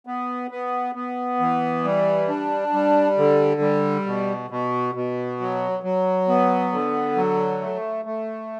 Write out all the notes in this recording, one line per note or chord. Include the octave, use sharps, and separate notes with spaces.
B3
B3
B3
E3
G3
D4
G3
D3
G3
B2
B2
B2
F#3
F#3
B3
D3
F#3
A3
A3